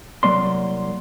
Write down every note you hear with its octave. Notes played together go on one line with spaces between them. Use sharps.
C2 F#3 A#3 D5 C6